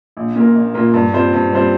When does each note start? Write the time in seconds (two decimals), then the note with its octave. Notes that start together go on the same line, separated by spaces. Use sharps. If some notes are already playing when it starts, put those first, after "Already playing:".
0.17 A#1
0.36 A#2 A#3 F4 A#4
0.55 A#1
0.74 A#2 A#3 F4 A#4
0.94 G2
1.13 G3 C4 F4 C5
1.33 G2
1.52 G3 C4 F4 C5